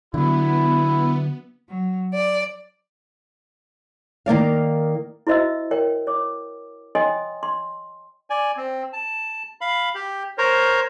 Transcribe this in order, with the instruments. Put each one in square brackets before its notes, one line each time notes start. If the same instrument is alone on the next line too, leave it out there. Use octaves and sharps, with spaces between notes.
[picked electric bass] D3 F#3 [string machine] B3 [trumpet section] E4
[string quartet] F#3
D5
[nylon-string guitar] D#3 A#3 D5 F5
[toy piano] E4 F#4 C5 D#5 E5 E6
A#4 C#5 G5
C#5 D6
C#5 D#5 G5 G#5 C6 D#6
C6
[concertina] D5 G#5
C4
A5
F5 B5
G4
A#4 C5 C#5